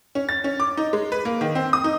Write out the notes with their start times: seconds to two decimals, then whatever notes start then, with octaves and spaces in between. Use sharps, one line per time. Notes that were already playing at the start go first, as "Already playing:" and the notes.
0.15 C#4
0.29 A6
0.44 C#4
0.60 D6
0.77 D#4
0.93 G#3
1.12 B4
1.25 A#3
1.41 D#3
1.55 C4
1.73 D#6
1.84 D#4